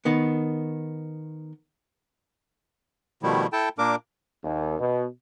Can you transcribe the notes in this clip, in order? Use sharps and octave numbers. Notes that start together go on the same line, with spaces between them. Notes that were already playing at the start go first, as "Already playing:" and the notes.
D#3 B3
B2 D#3 F3 G3 A3 E4
E4 A4 G5 A5
A#2 A#3 D4 A#4 D6
D#2
B2